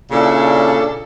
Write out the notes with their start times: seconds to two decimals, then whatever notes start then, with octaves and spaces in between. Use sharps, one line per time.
0.11 A#2 C#3 C#4 D4 E4 A4